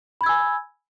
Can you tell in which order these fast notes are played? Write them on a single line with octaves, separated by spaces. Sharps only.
B5 G#6 E6 G#5